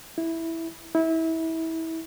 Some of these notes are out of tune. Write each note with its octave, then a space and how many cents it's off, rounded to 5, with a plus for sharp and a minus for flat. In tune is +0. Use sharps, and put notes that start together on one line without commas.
E4 -5
E4 -25